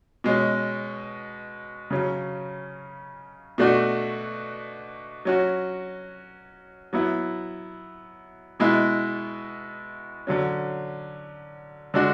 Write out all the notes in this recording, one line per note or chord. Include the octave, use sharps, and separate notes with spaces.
B2 G#3 C#4
C#3 F#3 C#4
B2 A3 D4 F#4
F#3 C#4 F#4
F#3 B3 E4
B2 G#3 B3 E4
D3 F#3 C#4
D3 G#3 D4 F#4